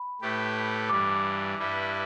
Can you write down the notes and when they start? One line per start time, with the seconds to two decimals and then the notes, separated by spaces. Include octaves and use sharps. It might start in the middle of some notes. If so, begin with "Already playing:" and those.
Already playing: B5
0.21 A2 A3 G4 B4
0.89 G2 E3 G3 D6
1.58 G2 G3 E4 B4